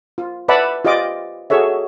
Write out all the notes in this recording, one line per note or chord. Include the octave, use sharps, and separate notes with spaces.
F4
B4 D5 E5 F#5 A5 B5
F4 G4 D5 D#5 D6
F#4 G#4 A4 C#5 E5